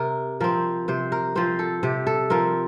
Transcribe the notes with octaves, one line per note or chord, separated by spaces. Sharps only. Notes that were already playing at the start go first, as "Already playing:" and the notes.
Already playing: C3 A#4
F3 C4 A#4
C3 C5
A#4
F3 C4 C5
A4
C3 G4
A4
F3 C4 A#4